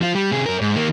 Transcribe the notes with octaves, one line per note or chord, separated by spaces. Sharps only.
F3 F4
G3
C3 G#4
F#2 A#4
G#2
D#3 A#3